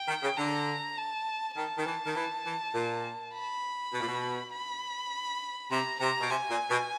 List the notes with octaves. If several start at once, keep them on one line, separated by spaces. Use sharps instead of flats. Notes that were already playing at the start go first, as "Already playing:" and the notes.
Already playing: G5
D#3
C#3
D3 A#5
A5
D#3 A5
D#3
E3
D#3
E3
E3
A#2
B5
B2
A#2
B2
B5
C3 A#5
C3 A#5
B2
C3 G#5
A#2
B2